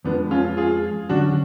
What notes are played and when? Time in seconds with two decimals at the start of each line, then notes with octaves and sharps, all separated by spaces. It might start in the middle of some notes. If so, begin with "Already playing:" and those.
0.05 F2 F3 G#3 B3 D4
0.31 C#4 F4
0.57 F4 G#4
1.09 D3 F#3 C#4 D4 F#4